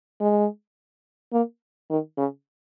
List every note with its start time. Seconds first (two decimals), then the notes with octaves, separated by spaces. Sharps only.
0.20 G#3
1.33 A#3
1.90 D#3
2.18 C#3